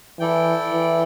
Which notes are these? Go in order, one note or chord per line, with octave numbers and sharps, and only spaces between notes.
E3 E4 A4 D5 G5
E3